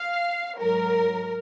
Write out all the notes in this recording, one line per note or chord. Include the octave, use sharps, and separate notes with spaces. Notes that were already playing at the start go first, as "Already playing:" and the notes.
Already playing: F5
G#2 F#3 A#4